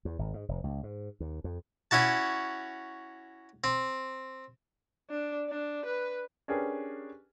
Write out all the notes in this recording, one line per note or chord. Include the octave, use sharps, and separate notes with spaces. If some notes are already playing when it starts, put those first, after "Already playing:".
E2
G#1
G#2
F1
C#2
G#2
D#2
F2
C#4 E4 F#4 A5
C4
D4
D4
B4
C#4 D4 G4 G#4 A#4 B4